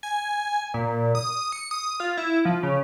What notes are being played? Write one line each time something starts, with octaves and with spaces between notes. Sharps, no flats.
G#5
A#2
D#6
C#7
D#6
F4
E4
F3
C#3